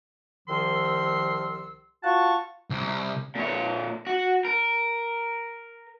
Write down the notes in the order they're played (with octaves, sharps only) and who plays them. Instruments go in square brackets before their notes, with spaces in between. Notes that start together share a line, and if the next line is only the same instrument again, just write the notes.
[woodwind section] C2 D#3 F3 C6 E6
F4 F#4 F#5 A5 C#6
[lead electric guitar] C2
[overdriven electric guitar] A#2 C#5
F#4
A#4